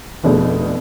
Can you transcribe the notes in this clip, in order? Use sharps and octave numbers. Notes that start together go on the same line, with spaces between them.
F1 B2 A3 D4 G#4 D5